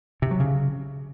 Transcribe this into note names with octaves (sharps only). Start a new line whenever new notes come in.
C3
F#3
C#3